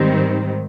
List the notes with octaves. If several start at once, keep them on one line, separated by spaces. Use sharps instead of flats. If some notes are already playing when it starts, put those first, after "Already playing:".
Already playing: G#2 D#3 G3 C4